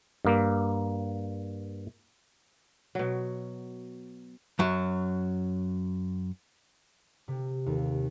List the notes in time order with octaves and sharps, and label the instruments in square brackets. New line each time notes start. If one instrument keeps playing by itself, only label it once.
[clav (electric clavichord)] G2 A#3
[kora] B2 F#3
[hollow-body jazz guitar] F#2 F#3
[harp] C3
D#2